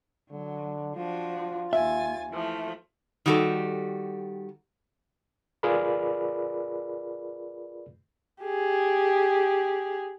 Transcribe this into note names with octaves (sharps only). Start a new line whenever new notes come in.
D3 F#3
F3 D4 F4 F#4
D#2 E5 G#5 A6
E3 F3 A3
D#3 G3 F#4 G4 A4
F4 G#4 A#4 B4 D5 B5
G4 G#4